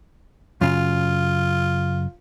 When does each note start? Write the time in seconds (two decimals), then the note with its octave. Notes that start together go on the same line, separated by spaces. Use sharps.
0.61 F#2 C#3 F4